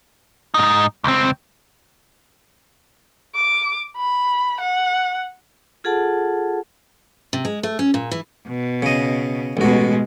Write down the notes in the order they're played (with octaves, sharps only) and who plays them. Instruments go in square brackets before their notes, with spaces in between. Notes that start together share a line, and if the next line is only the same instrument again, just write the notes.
[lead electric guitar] G#2 D#4
C#2 C4
[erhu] D6
B5
F#5
[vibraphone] F4 G#4 A4 F#5 A5
[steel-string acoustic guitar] C3
G#3
A3
C#4
A#2
E3
[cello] B2
[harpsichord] C#3 D#5
[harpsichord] A1 F#4 [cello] B2 G#3